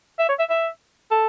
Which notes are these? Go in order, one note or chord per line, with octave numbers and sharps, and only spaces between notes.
E5
C#5
E5
E5
A4